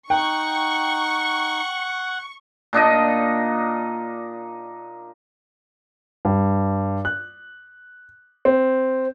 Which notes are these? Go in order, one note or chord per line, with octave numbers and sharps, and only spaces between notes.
D#4 F#5 G5 C#6
A#2 D4 D#4 D#5
G2
F#6
C4